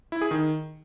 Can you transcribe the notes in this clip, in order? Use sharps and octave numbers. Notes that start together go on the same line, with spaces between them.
E4
G#4
D#3